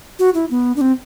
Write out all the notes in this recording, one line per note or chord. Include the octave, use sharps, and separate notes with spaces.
F#4
E4
B3
D4
C4